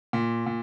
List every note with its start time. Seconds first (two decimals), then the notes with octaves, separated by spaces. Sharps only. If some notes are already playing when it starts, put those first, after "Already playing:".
0.13 A#2
0.47 A#2